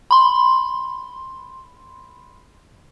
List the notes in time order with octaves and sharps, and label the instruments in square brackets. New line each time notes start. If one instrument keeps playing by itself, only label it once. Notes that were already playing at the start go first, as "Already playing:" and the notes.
[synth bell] B5 C6